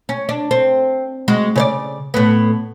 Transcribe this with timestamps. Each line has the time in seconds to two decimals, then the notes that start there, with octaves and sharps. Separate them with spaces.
0.09 C#4
0.29 D4
0.51 C4
1.28 G#3 F#4
1.56 C#3 C#5 D5
2.14 A2 B3